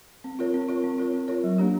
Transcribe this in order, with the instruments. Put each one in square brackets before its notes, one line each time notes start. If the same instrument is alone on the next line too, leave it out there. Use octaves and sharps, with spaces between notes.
[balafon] C4
F4 A#4 C#5
C4
F4 A#4 C#5
C4
F4 A#4 C#5
C4
F4 A#4 C#5
F#3
A#3 D4 G4